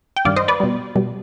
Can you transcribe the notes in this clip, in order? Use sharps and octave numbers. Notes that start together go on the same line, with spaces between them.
G5
G2 D#3 G3 D5 F5
C5 D#5
B4 D5
B2 G3
B2 G3